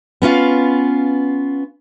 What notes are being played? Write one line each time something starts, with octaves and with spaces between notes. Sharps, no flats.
B3 C#4 F4 F5